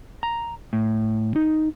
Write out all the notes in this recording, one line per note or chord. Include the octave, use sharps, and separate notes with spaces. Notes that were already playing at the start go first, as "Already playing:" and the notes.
A#5
A2
D#4